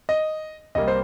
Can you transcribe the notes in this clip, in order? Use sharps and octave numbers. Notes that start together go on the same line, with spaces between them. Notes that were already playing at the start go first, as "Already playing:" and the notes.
D#5
C2 C3 G3 A#3 D#5
C5